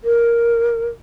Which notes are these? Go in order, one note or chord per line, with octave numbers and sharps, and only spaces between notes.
A#4